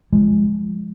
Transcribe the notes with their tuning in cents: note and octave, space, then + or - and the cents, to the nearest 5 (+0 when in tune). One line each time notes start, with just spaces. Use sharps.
F3 +0 G#3 +0